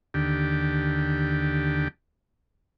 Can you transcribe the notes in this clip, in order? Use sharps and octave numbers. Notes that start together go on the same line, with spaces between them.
D#2 D3 G4